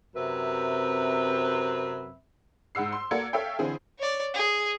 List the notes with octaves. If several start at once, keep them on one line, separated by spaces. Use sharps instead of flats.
F#2 C3 C4 B4 E5
G#2 G#3 F#5 E6 C7
C6
A#3 F#4 A4 D5 G#6 C#7
A4 C#5 E5 F5 G5
D3 E3 C4 G#4
C#5 D5
G#4